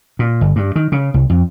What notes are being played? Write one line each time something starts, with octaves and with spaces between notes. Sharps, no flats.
A#2
G1
G2
D#3
C#3
C2
F2